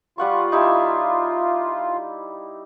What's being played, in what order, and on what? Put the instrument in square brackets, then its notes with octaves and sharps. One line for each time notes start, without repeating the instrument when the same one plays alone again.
[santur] G3 F#5 C#6 [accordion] F4
[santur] D#4 E4 G4